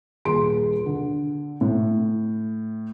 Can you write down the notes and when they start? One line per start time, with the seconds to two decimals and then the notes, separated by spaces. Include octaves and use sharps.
0.25 D#1 G#4 C6 D7
0.86 D3
1.61 A2